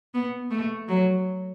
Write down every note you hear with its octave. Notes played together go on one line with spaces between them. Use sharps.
B3
A3
F#3